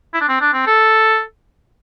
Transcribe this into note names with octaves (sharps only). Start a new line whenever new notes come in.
E4
D4
C4
D4
C4
A4